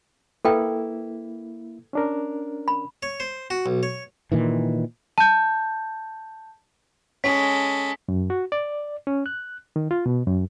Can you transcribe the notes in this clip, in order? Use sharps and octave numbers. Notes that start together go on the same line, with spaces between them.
A#3 E4 A4 B4 G5
C#4 D4 A#4
B5
C#5
C5
F#4
B1
C#5
A#2 D#3 E3
A5 G6
G#3 C#4 A4 B6
F#2
F#4
D5
C#4
F#6
D#3
F4
B2
F#2